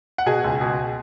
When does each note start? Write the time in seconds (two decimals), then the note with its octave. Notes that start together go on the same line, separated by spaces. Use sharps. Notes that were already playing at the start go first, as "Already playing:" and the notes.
0.18 F#5
0.26 B2 G#4 G#5
0.44 C#2
0.61 B2